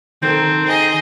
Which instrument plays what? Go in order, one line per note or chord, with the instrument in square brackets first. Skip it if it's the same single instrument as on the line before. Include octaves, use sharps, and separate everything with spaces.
[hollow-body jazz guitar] D#3 A4 A#4 [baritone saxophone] C4
[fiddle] G#4 D#5